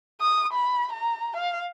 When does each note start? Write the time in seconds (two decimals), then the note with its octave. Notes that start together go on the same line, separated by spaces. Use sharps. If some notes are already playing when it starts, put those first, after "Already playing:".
0.21 D#6
0.53 B5
0.92 A#5
1.37 F5